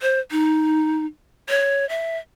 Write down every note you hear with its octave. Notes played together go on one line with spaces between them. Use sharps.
C5
D#4
C#5
E5